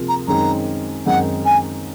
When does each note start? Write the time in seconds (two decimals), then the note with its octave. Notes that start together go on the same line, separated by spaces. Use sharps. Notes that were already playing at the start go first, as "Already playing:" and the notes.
Already playing: C3 F3 A#3 F4 G#4
0.08 A#5
0.28 F#2 D#3 G#3 C4 D#4 A#5
1.06 F#2 D#3 G#3 C4 D#4 F#5
1.45 G#5